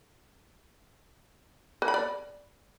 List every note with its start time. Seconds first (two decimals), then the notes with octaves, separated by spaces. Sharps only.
1.82 B4
1.88 B5
1.94 D5